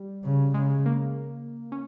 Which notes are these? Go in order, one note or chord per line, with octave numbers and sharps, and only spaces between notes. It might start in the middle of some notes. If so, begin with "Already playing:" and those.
Already playing: G3
C#3
C#3 G#3
A#3
C#4